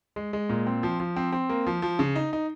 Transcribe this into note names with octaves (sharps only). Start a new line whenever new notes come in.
G#3
G#3
A#2
C4
F3
F3
C4
C4
A#3
F3
F3
C#3
D#4
D#4